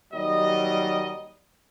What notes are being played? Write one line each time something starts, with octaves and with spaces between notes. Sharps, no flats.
D#2 F#3 G3 D#5